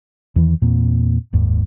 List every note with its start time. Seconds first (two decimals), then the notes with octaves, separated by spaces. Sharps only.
0.36 E2 D#3 E3
0.62 E2 A#2 A#3 C4
1.33 F#1 D#2 G#2